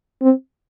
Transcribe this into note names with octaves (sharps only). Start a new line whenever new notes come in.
C4